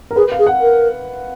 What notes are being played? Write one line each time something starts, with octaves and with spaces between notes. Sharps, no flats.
A#4
G#4 B4
F5
G#4
F#5
A#4